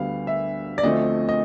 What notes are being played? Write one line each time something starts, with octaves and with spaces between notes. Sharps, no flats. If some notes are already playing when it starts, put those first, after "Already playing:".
Already playing: D2 D3 G3 B3 F5
E5
D5
D2 D3 F3 A3 C4 D#5
D#5